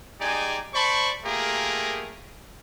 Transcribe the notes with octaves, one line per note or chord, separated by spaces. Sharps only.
G#3 D#4 G4 D5 G#5
C5 D5 A5 B5 C#6
A3 A#3 F4 G4 G#4 A#4